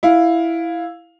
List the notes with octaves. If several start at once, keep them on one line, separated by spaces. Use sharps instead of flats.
E4 F5